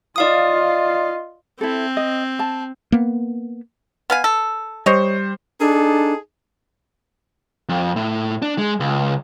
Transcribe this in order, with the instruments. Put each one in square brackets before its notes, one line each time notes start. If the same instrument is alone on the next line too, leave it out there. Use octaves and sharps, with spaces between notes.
[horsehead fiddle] F4 D#5 [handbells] D5 F5 D#6
[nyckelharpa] C4 [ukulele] E4 A4
[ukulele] D#5
A5
[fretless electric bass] A#3 B3
[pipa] B3 F5 G#5
A4
[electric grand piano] G3 C5 [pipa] C#5 D#5
[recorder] D4 [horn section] D#4 G#4 A4
[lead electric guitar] F2
A2
D4
G#3
C#2